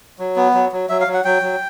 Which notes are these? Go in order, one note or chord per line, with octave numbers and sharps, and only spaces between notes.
F#3
B3
F#3
F#3
F#3 E5
F5
F#3
F#5
F#3 G5
F#3